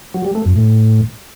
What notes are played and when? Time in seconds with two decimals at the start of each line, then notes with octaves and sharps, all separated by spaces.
0.14 F#3
0.25 G3
0.35 A3
0.46 F#2
0.56 A2